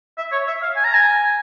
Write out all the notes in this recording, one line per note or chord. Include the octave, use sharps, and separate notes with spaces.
E5
C#5
E5
F5
G#5
A#5
G#5